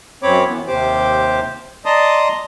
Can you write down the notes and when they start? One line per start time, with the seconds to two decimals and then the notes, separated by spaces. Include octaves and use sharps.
0.23 F#2 C4 C#5 B5 D6
0.46 E3 B3
0.68 D#2 C3 G4 C5 D6
1.86 D5 D#5 A5 A#5 C6 D#6